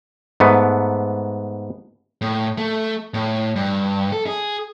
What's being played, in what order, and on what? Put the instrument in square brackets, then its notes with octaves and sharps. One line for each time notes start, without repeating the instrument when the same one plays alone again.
[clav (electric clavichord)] G#2 A3 B3
[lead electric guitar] A2
A3
A2
G2
A4
G#4